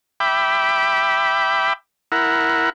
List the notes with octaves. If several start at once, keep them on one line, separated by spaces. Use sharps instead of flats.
E5 G5 B5 D6
E4 A#4 F#5